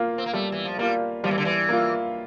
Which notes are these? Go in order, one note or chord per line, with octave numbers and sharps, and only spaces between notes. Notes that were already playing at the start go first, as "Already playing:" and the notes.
Already playing: A#3 F4
C4
A#3
G3 A3
E3
F3
G3 A#3 F4
F3 G3
E3
D3
E3
A#3 F4